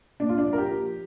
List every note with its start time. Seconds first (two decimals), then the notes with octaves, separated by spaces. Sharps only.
0.20 A#2 D4
0.29 F4
0.38 D4
0.45 F3
0.53 A#4
0.58 G4
0.70 F3